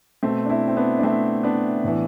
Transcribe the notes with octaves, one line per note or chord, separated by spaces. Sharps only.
B2 A3 C4
D4
C4 E4
C4
B3 D4
D4
A3 C4
B3 D4
A2 E3